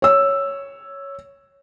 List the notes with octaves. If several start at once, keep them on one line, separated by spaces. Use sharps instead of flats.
C#5 E6